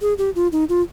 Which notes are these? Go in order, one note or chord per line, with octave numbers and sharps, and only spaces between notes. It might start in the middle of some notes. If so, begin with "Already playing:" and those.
G#4
G4
F4
D#4
F4